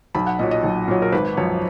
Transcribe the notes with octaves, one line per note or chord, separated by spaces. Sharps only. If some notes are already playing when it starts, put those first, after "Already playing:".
B1 B5
F#5
A#2 F#3 D#5
D#5
B1
A#2 F#3
A#4
G#1 B4
F#2 F3 C#5